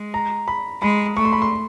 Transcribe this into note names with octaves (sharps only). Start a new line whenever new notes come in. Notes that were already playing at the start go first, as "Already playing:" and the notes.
Already playing: G#3
A#5
B5
G#3 B5
A3 C#6
C6
B5
C6